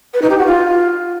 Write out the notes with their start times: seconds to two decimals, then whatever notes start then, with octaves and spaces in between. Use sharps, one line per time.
0.14 B4
0.22 D#4
0.30 G4
0.38 F#4
0.46 F4